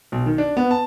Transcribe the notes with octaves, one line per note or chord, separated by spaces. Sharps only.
B1
D#3
D4
B3
A5